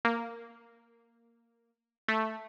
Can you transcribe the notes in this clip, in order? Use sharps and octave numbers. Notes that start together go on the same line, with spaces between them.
A#3
A3